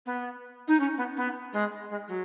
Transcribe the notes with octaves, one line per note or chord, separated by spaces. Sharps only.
B3
D#4
C#4
B3
B3
G#3
G#3
F#3